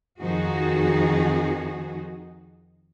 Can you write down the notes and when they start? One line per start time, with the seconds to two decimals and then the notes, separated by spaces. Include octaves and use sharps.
0.21 F2 D#3 F3 D#4 F#4 G#4